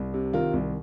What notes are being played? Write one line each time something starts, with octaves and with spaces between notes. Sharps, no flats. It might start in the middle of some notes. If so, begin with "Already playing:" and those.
Already playing: C2
C3
D#3 F4 A#4
C2